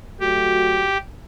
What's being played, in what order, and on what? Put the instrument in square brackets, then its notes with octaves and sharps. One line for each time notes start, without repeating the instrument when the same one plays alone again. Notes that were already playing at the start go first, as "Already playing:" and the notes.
[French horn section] F#3 A3 F#4 [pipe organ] G4